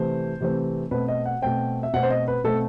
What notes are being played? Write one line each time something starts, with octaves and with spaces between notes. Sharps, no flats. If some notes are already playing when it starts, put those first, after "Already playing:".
Already playing: C3 E3 A3 C4 C5
C3 E3 A3 C4
B2 A3 C4 B4
D#5
F#5
B2 A3 C4 G5
E5
B2 A3 C4 F#5
C5
D#5
B4
B2 A3 C4 A4